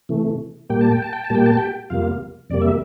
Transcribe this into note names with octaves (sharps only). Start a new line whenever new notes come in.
C3 E3 A3
A#2 G3 A#3 G5
A5
G5
A5
G5
A5
A#2 G3 A#3 G5
A5
G4 G5
F2 C3 G3 A#3 F4 F5
F2 C3 G3 A#3 D5
E5